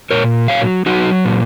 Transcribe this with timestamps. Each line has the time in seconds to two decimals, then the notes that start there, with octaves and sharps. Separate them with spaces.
0.11 A#2 A#4 C#5
0.48 F#3 C#5 F5
0.86 F#3 D#4 F#4
1.25 A#2